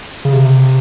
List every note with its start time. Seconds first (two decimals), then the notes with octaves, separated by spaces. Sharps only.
0.25 C#3
0.33 C3